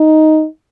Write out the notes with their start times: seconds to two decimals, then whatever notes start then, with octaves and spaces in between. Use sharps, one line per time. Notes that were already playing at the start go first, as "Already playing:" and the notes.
Already playing: D#4